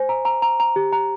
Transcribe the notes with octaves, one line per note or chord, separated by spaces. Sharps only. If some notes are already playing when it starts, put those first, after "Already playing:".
Already playing: C5 G#5
A#5
A#5
A#5
A#5
G4
A#5